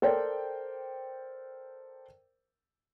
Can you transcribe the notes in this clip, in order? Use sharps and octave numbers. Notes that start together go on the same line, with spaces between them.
A4 A#4 C5 D5 G5